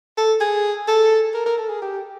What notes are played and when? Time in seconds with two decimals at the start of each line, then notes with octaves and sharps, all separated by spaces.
0.18 A4
0.41 G#4
0.88 A4
1.34 A#4
1.46 A#4
1.58 A4
1.69 G#4
1.82 G4